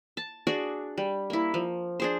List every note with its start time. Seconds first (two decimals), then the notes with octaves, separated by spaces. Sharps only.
0.17 A5
0.47 D4 F#4 G#4 D5
0.98 G3
1.30 A#3 E4
1.54 F3
2.00 D4 G#4 C5